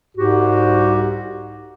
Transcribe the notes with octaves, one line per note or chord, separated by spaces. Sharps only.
C2 G#2 F#4 G4